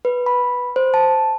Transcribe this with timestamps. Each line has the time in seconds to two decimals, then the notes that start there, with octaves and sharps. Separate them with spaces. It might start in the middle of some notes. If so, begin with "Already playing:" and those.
0.05 B4
0.26 B5
0.76 C5
0.94 A5